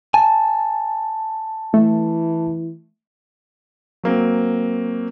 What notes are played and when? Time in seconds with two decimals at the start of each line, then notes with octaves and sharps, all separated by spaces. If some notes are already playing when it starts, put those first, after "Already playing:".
0.14 G#5 A5
1.74 E3 A3
4.03 F#3 A#3 C4